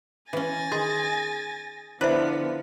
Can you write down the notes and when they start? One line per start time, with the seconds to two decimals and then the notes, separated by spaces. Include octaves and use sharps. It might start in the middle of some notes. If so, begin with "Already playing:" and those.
0.33 E3 C#4 G#5 A6 A#6
0.72 D#3 G#4 C6
2.01 D3 F3 B3 D4 E4 B4 C5 E5